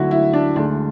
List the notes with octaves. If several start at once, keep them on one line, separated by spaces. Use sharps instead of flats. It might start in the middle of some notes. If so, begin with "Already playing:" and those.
Already playing: D2 D3 F#3 E4 F#4
E4
D4
D2 D3 G#3 D4